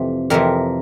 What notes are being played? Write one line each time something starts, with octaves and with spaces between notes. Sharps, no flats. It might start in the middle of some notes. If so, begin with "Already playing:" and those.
Already playing: F2 C3 E3 A3
F2 C3 E3 A3 A#4